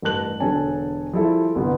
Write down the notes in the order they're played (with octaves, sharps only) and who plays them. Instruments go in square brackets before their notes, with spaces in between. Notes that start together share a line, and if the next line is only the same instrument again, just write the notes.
[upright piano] A1 G2 A#4 A5 F#6 F#7
E1 D3 A4 C#5 G#5 A5
F3 G3 E4 G#4 A4
G1 C2 B3